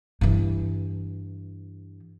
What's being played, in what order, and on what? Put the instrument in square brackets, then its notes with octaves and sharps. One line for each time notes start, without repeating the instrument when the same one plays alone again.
[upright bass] G2 E3